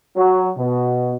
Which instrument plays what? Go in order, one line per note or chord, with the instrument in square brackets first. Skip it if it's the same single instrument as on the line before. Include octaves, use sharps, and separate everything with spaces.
[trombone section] F#3
B2